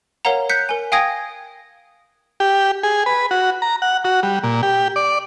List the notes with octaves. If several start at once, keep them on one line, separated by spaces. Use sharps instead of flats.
A#4 C#5 F5 F#5 A#5
F#6 G6 B6 C#7
A#4 G#5
F5 G5 G#5 D#6 G#6 A#6
G4
G#4
B4
F#4
A#5
F#5
F#4
G3
A#2
G4
D5